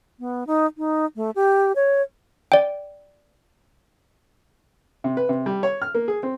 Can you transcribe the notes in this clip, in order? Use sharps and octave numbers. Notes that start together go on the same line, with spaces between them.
B3
D#4
D#4
A3
G4
C#5
D5 G5
C3
B4
C3
G3
C#5
F6
A#3
G#4
C4